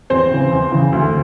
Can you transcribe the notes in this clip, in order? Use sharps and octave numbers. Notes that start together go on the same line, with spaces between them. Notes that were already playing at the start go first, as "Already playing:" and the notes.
E2 C4 C5
C#3 E3
E2
C#3 E3
D2